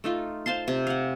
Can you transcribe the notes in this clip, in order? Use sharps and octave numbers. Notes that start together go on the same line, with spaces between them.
A3 D#4 F4
C5 F5 A5 C6
C3
F5 F#5